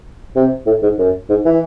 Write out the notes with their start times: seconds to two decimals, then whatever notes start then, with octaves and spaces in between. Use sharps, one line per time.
0.36 C3
0.66 A2
0.82 G#2
0.98 F#2
1.29 G#2
1.45 E3